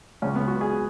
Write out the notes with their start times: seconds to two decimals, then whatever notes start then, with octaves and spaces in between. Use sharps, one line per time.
0.22 C#2 C#3 C#4
0.35 B3
0.48 F#4
0.61 G#4